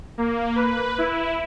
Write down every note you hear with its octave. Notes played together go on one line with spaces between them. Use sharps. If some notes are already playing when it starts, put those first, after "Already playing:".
A#3
B4
E4